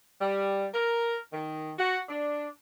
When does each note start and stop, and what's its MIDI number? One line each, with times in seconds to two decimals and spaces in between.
0.20 0.66 55
0.74 1.17 70
1.33 1.72 51
1.78 1.98 66
2.09 2.46 62